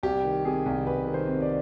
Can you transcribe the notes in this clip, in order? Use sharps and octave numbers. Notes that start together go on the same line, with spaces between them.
C2 G4
D#3
C3 G#4
C2
C2 B4
D#3
C5
C3
D5